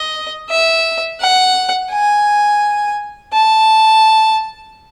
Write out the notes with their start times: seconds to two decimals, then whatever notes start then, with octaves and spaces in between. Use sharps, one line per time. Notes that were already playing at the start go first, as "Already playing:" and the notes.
Already playing: D#5
0.50 E5
1.21 F#5
1.91 G#5
3.33 A5